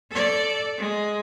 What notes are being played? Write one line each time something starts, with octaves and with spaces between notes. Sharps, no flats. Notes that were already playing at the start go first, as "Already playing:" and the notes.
A4 D5
G#3